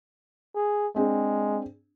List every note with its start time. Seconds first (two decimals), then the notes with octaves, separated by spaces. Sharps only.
0.56 G#4
0.96 G#3 C4 D4 G#4